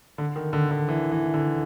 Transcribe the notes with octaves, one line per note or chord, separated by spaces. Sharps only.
D3
D#3
D3
D3
E3
E3
D3